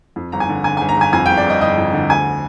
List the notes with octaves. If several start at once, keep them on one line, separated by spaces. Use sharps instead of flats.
F2
G1 A#5
G#5
D3
D3 G#5
G1 G#5
A#5
G1 G#5
F2 G#5
G1 G5
D5
G1 D#5
G1 D#5
F2
D3
D2 G#5